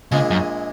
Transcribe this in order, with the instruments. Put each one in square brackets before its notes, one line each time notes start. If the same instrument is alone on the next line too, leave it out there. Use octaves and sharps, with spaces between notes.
[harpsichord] A#1 A#2 G#3 [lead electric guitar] C#3
[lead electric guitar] F#2